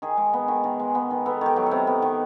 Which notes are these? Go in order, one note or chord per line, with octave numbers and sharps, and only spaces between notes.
D#3 G#4
G#3
B3
D#3
D#3
G#3
B3
D#3
B3 A4
D#3 G4
F#3
C3 A4
B3
D#3